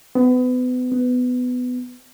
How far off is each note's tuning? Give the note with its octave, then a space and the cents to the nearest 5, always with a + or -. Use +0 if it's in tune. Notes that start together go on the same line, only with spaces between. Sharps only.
B3 +30
B3 +15